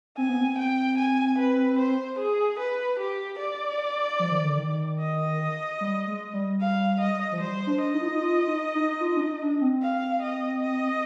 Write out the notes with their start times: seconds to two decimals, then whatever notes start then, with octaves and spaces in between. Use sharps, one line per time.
0.18 C4 G#5
0.29 B3
0.41 C4
0.58 G5
0.98 G#5
1.38 B4
1.79 C5
2.19 G#4
2.59 B4
2.99 G4
3.39 D5
4.19 F3
4.31 D#3
4.45 D3
4.58 D#3
5.00 D#5
5.81 G3
6.07 G#3
6.33 G3
6.60 F5
7.00 D#5
7.32 F3
7.41 G3 C5
7.67 D4
7.81 D#5
7.94 D#4
8.02 F4
8.09 D#4
8.21 F4
8.47 D#4
8.75 D#4
9.01 F4
9.17 D4
9.21 D#4
9.42 D4
9.61 C4
9.82 F5
10.22 D#5
10.62 D#5